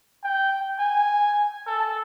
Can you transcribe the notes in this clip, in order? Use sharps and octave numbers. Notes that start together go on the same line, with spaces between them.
G5
G#5
A4